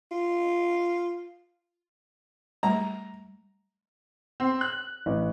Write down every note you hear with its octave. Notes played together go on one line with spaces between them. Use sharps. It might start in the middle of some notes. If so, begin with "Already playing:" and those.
F4
G3 A3 A#5
C4
F#6
A1